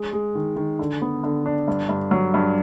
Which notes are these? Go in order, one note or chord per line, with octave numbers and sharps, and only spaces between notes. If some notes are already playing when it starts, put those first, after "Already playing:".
Already playing: G#3
G#3
D#3
D#3
D3
B3
D3
D4
G2
G2
F#3
G2